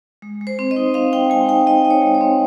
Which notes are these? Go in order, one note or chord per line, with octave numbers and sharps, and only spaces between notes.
G#3
G#3
C5
C4
D#5
D#4
C4 F5
C4 G5
G#3 G#5
D#4 G5
D#4 D#5
D#4
C#5
G#3
C#5
C4